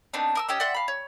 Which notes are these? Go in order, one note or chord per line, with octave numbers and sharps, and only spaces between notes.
B3 C4 D4 D#4
A#4 D#6 E6
C#4 G4 D#5 E6
D5 E5 F#5 C6
F5 B5
C#5